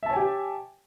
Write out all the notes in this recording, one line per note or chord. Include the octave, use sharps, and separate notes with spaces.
G4 C#5 E5 G#5 A5